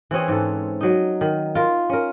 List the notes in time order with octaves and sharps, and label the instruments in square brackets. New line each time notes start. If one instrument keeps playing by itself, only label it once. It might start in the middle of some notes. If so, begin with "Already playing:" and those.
[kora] E3 C4 C#4 G#4
G#2 A4
F#3 D#4
D#3
F4 A#4
C#4 A#4